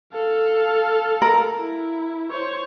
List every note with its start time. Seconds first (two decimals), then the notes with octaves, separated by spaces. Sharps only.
0.14 A4 F5
1.22 A#4
1.60 E4
2.30 C5 C#5